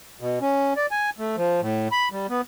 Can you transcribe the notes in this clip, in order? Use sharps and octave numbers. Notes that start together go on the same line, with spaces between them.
B2
C#4
D5
G#5
A3
F3
A2
B5
G3
B3